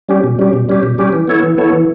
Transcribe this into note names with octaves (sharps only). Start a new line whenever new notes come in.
G3 C#4 G4
B2
G3 C#4 G4
B2
G3 C#4 G4
B2
G3 C#4 G4
E3
B3 E4 A4 C#5
E3
B3 E4 A4 C#5
E3